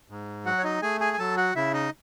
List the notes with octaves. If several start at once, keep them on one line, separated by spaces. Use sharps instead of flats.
G#2
F#3 F#4 F#5
C#5
D#4 D#5
A3 G#4 G#5
G#4 G#5
G#5
F#3 A4 A5
F#4 F#5
C#3 E4 E5
D#4 D#5